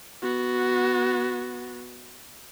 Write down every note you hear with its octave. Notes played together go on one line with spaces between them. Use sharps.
B3 F#4